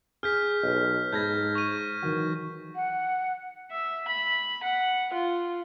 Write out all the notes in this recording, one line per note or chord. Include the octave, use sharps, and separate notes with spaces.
G#4 F6 G6 B6
B1 D#5
G#2 A5 B5 E6 G6 G#6 A#6
C#6 D#7 F7
D#3 E3 F#3
F#5
E5
B5
F#5
F4